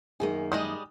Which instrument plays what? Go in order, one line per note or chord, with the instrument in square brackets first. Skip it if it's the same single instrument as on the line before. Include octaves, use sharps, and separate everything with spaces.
[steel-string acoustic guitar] F#2 D#3 A#3 [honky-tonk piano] G#4
[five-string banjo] G3 G#3 D#5 [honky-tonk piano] D#6